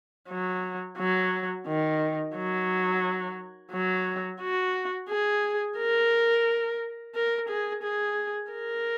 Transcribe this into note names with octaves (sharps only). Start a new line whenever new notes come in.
F#3
F#3
D#3
F#3
F#3
F#4
G#4
A#4
A#4
G#4
G#4
A#4